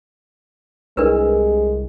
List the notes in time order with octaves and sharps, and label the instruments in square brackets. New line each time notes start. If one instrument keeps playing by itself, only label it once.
[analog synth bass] C2 [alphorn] G#3 [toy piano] D4 A#4 B4